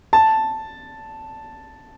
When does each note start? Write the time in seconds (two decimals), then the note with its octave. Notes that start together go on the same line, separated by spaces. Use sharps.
0.13 A5